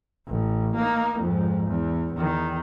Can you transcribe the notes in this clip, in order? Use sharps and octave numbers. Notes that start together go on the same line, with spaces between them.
A1
A#3 D#4
F2 G#2
E2
E2 D#3